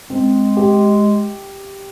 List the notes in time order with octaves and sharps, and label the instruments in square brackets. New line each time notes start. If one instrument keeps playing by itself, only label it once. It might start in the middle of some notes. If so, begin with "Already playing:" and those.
[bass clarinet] G#3 [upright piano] C4
[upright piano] G4